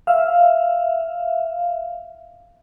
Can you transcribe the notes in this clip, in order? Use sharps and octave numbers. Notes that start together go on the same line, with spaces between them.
E5 F5